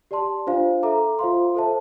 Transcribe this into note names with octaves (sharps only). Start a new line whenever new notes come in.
G4 D5 A5 C6
D4 F4 C5 F5
A4 E5 A#5 D6
F4 C5 F5 C6
A4 C5 E5 A5